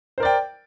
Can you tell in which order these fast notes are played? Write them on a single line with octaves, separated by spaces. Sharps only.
C5 A#4 D5 G5